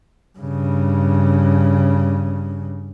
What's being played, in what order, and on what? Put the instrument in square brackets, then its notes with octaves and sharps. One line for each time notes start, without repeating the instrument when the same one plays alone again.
[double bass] G2 C#3